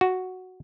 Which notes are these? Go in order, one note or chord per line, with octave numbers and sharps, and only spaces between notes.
F#4